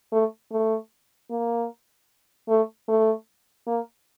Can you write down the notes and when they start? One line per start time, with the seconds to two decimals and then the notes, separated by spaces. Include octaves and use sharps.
0.12 A3
0.52 A3
1.31 A#3
2.49 A3
2.88 A3
3.67 A#3